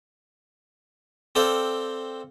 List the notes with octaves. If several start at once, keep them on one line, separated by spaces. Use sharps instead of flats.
C4 A4 D5 F5 G5